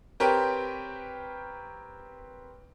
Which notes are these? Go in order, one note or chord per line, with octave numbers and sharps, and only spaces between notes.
C4 G4 A#4 B4 C#5 G5